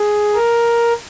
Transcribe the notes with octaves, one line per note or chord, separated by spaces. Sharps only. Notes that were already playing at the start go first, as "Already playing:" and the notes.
Already playing: G#4
A#4